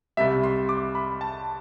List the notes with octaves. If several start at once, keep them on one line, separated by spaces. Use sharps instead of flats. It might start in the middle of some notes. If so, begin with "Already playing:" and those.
C2 C3 G3 E5
C6
D6
B5
A5